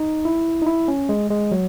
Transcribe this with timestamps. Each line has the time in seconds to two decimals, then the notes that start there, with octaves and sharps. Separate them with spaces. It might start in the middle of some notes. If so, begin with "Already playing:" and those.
Already playing: D#4
0.25 E4
0.62 D#4
0.66 E4
0.88 C#4
1.09 G#3
1.30 G#3
1.52 F#3